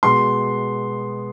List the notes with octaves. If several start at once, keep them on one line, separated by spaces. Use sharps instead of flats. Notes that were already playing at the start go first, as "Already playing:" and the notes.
B2 G#3 B3 C6